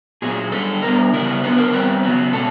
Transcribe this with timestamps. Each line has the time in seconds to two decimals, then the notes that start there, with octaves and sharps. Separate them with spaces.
0.22 A#2 F#3 A#3 C#4 G#4
0.52 F#2 D3 G3 A4
0.82 D3 G3 B3 A#4
1.13 C#3 E3 G3 B3 A#4
1.43 D3 F#3 B3 B4
1.58 A#4
1.73 E2 B2 G3 C4 B4
2.03 C#3 F#3 B3
2.33 B2 G#3 A4